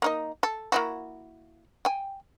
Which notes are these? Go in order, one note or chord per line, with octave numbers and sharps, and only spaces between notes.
A#3 D#4 D#5
A4
A#3 E4 F#4
G5 G#5